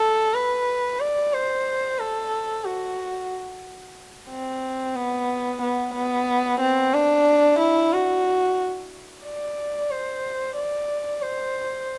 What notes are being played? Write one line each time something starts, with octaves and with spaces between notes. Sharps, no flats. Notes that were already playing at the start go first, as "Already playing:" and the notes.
Already playing: A4
B4
D5
C5
A4
F#4
C4
B3
B3
B3
C4
D4
E4
F#4
D5
C5
D5
C5